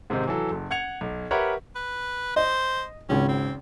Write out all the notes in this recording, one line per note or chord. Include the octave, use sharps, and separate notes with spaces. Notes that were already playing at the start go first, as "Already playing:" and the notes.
G#2 C3 D#3 C4 D#4
E3 F#3 A4
F#1
F#5 G#6 C#7 F7
B1
G4 A#4 B4 C#5 E5 F#5
B4
C5 D#5
G#1 C#2 C#4
C4